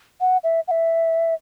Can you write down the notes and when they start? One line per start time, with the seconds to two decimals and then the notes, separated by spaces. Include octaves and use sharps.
0.21 F#5
0.44 E5
0.68 F#5
0.71 E5